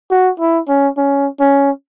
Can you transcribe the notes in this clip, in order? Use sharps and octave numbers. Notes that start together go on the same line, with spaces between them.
F#4
E4
C#4
C#4
C#4